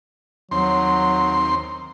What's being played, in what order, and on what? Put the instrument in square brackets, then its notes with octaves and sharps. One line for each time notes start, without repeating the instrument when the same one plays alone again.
[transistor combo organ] D#2 C4 C6 [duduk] F#3